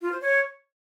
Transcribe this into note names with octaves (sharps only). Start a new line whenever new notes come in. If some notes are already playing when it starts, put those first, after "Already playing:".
F4
C5
C#5